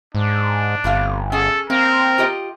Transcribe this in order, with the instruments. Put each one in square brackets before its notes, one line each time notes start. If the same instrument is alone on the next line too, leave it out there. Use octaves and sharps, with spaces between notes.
[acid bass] G#2 [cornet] D4
[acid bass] G1 [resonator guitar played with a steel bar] A2 C3 F5
[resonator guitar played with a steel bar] C#4 G#4 [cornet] A4
[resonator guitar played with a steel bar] A#3 [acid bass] C4 [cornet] A#4
[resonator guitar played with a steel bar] F4 G4 D#5